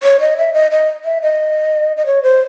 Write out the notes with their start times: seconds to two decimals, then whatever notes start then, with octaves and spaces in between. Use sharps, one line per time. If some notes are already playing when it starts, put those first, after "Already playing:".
0.03 C#5
0.20 D#5
0.38 E5
0.53 D#5
0.71 D#5
1.05 E5
1.22 D#5
1.97 D#5
2.06 C#5
2.23 C5